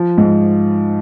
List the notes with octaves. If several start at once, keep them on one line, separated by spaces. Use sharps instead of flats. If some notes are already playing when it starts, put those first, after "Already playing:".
Already playing: F3
G#2